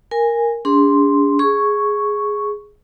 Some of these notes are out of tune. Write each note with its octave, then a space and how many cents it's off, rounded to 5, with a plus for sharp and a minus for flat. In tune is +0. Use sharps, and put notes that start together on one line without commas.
A#4 +0 G#5 -15
D4 -35 G#4 -35 C6 +0
G#4 +0 C#6 +0